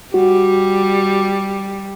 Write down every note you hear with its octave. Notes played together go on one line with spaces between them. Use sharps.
G3 F#4